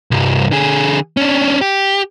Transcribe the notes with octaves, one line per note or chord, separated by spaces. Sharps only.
C2 G2
D3 G#4
C#4 D4
G4